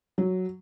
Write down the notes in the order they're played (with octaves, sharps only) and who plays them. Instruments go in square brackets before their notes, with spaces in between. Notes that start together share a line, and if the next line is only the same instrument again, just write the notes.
[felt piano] F#3